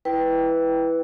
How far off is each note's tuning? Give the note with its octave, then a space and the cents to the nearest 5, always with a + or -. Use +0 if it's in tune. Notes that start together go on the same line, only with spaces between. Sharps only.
E4 +0 B4 +0 G5 +0